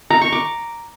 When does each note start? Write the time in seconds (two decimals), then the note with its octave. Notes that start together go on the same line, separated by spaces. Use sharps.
0.10 A#5
0.21 C#6
0.32 D6